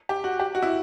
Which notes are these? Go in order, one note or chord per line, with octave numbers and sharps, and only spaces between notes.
G4
F#4
G4
F#4
E4